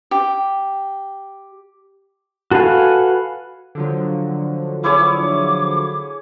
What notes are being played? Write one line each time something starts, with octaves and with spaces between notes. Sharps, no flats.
G4
F#4 A4 B4 F5 G#5
D3 F3 F#3
E4 G#4 C#5 D6